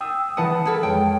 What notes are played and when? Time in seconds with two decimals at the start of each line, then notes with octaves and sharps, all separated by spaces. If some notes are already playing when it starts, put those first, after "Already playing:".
0.01 G5 D#6 E6
0.37 E3 B4 F#5 A5 D#6
0.65 E4 A4 A#4
0.83 F2 G#3 C#5 G5